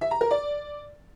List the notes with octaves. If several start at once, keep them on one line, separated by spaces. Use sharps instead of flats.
E5
A#5
A#4
D5